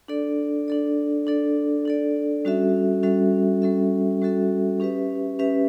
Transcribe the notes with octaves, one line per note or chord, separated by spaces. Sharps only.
D4 A4 D5
D4 A4 D5
D4 A4 D5
D4 A4 D5
G3 C#4 F#4 A4 E5
G3 C#4 F#4 A4 E5
G3 C#4 F#4 A4 E5
G3 C#4 F#4 A4 E5
C#4 G4 B4 E5
C#4 G4 B4 E5